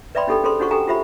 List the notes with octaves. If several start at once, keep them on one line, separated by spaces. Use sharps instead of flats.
B4 D5 E5 G5 B5 C6
D4 D#4 G4 A4 G5 B5
C#4 G#4 A4 C5 B5 C6
D4 D#4 F#4 C5 F#5 C#6
G4 A4 G5 G#5 A#5
F4 G4 C5 E5 B5